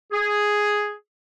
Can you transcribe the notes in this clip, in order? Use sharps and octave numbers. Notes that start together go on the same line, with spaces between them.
G#4